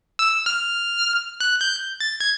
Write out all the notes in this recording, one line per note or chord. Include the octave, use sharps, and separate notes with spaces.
E6
F6
F#6
G6
A6
G#6